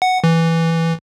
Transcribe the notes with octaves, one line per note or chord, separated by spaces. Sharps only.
F#5
E3